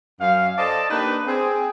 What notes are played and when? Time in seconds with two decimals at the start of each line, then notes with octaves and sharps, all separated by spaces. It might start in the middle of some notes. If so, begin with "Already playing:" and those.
0.21 F#2 F5
0.58 A4 C5 D5 D#5 A5
0.90 A#3 D4 D#4 G4 B4
1.27 C4 G#4